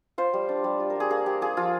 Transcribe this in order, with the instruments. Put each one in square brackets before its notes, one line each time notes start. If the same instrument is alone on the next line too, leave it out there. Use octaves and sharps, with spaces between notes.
[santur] F4 C5
G3
D4
G3
F4
A#4
G3 G#4
A#3 G#4
G3 G4
F4 G#4
F3 F4